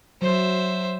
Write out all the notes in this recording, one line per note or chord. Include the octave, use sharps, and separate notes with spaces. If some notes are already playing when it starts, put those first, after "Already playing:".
F#3 C5 E5